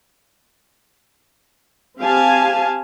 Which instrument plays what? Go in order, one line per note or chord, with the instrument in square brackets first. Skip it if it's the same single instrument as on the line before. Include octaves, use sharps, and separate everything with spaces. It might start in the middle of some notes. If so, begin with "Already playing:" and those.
[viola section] C4 G4 F5 G#5 A5